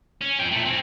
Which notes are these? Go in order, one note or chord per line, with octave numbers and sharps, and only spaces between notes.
C#4
F2 G5
A#2 A3
C4 C#4